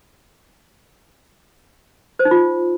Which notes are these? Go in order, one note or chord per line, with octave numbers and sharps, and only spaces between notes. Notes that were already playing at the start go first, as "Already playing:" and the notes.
C5
D#4
F4